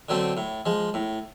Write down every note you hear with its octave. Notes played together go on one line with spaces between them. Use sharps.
D3 F#3 A3 C4
A2
F3 G#3
A2